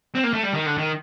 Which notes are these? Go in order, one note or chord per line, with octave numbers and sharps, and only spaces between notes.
C4
A#3
A3
G3
D#3
D3
D#3